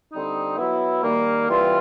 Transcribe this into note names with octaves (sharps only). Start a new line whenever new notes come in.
D3 G3 C4 D#4
F#3 B3 E4
D#3 G3 A#3
E3 G3 C4 F4